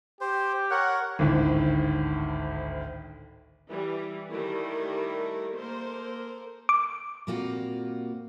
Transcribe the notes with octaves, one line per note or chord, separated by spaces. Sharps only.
G4 C5
A#4 C#5 F#5
G#1 D2 A2
E3 G3
D#3 G3 A3 E4 A#4
A#3 A4 A#4 C5
D6
A#2 G3 A#3 C4 F4 F#4